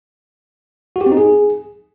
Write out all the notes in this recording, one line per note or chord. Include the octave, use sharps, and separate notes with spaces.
F#4
G4
C4
D#4
G#4